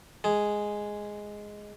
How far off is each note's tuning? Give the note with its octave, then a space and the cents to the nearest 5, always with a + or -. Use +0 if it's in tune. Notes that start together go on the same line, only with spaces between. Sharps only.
G#3 +0 G#4 +0